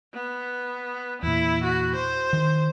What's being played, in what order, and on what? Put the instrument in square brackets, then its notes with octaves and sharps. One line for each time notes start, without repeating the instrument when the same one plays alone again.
[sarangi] B3
[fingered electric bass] E2 A#2 [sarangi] E4
[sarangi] F#4
C5
[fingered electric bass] D#3